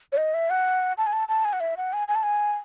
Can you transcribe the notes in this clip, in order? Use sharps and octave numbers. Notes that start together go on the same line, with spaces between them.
C#5
D#5
E5
F#5
A5
G#5
A5
A5
G#5
F#5
E5
F#5
G#5
G#5
A5
G#5